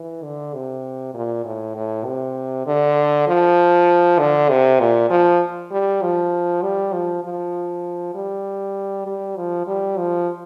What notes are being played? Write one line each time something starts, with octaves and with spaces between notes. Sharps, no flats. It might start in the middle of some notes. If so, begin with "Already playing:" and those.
Already playing: E3
D3
C3
A#2
A2
A2
C3
D3
F3
D3
C3
A#2
F3
G3
F3
G3
F3
F3
G3
G3
F3
G3
F3